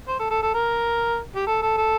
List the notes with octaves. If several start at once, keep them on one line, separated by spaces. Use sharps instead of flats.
C5
A4
A4
A4
A#4
G4
A4
A4
A4